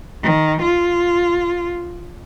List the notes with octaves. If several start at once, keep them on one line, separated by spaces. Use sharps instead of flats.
D#3
F4